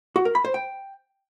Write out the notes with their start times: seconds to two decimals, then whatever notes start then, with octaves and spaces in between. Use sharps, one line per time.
0.16 F#4
0.25 A#4
0.35 B5
0.45 C5
0.54 G5